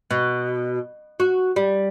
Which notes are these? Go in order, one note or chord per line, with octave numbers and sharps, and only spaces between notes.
B2
F#4
G3